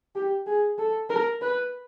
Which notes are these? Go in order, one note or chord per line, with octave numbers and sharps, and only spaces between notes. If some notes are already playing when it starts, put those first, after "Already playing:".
G4
G#4
A4
A#4
B4